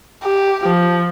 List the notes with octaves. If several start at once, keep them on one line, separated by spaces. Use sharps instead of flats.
G4
F3